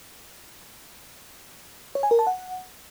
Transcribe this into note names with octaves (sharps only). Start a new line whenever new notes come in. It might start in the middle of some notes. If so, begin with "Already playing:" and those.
C#5
G#5
A#4
A5
F#5